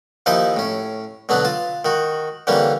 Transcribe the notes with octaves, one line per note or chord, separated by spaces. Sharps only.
D#2 F3 D#4 E4 D#5 D6
A2 C#4
B2 D3 F#3 B3 D4
F4 A5
D#3 F#4
D3 E3 G3 A#3 C#4